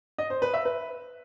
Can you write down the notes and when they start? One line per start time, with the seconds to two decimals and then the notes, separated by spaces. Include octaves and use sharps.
0.18 D#5
0.30 C5
0.42 B4
0.54 E5
0.65 B4